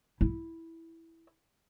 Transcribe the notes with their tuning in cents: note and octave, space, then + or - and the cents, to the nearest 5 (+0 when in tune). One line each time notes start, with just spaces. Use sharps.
E4 -5